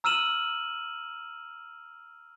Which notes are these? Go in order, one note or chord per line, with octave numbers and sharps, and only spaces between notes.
A#5 E6 F6 D#7 E7 F#7